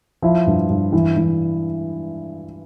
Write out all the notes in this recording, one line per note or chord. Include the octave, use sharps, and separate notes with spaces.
F3 E4
G2
G2
E3
E3